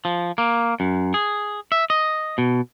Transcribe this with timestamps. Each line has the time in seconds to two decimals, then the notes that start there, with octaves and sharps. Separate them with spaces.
0.05 F3
0.38 A#3
0.80 F#2
1.14 G#4
1.72 E5
1.90 D#5
2.38 B2